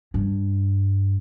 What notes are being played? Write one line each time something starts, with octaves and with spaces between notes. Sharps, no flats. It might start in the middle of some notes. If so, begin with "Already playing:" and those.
G2